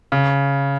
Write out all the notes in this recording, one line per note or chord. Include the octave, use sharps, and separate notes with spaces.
C#3